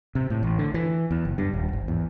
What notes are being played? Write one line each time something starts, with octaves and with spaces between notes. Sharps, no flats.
C3
A2
A1
D3
E3
E2
F#1
G2
D#1
G#1
E2